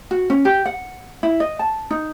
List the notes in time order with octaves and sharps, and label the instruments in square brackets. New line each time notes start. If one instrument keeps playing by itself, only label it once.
[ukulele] F#4
C#4
G4
F#5
E4
D#5
A5
D#4